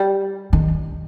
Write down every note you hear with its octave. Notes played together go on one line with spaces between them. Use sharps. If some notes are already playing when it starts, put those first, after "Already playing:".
Already playing: G3
D#3